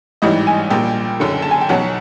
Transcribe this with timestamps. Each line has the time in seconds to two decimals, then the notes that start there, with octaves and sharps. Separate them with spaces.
0.22 A1 G#2 E3 G3 D#5
0.47 G#5
0.70 A#1 A#2 G3 G5
1.20 F#1 F#2 D3
1.42 A5
1.51 G#5
1.61 G5
1.69 B1 B2 F#3 F#5